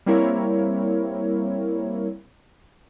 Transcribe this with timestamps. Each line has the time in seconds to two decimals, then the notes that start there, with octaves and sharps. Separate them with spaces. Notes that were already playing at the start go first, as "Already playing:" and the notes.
0.06 G3 A#3 C4 E4 A#4 C#5